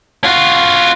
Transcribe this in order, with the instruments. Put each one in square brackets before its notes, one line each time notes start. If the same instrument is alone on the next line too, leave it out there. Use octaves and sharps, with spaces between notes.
[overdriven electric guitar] F4 F#4